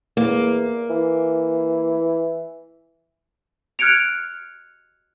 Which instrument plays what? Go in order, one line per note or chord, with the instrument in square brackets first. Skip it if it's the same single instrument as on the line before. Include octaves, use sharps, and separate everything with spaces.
[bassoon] E2 [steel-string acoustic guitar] A#3
[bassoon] E3
[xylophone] F6 F#6 G#6 C#7 D7 F7